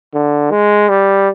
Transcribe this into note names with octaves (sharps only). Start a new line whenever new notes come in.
D3
G#3
G3